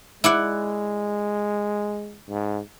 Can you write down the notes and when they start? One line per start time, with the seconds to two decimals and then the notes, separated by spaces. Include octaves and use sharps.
0.24 G#3 E4 D5 F#5
2.29 G#2